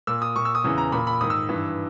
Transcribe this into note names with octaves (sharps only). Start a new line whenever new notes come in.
A#2 E6
D#6
A#2 C#6
E6
D#6
E2 C#3 E3
A#5
A#2 B5
B5
G#2 D#3 D#6
E6
G2 E3